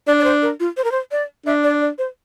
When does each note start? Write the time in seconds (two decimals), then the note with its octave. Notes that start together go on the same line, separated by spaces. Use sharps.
0.07 D4 D5
0.19 D5
0.24 C5
0.42 A#4
0.60 F4
0.77 C5
0.84 A#4
0.92 C5
1.11 D5
1.46 D4 E5
1.64 D5
1.81 D5
1.98 C5